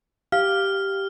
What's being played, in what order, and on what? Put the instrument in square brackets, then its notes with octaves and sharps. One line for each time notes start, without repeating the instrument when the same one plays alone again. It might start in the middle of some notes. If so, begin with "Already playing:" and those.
[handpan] G4 [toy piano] F5 [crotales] F6